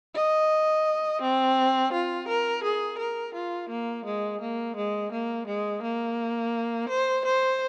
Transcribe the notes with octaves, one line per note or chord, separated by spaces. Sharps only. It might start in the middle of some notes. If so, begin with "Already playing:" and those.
D#5
C4
F4
A#4
G#4
A#4
F4
A#3
G#3
A#3
G#3
A#3
G#3
A#3
C5
C5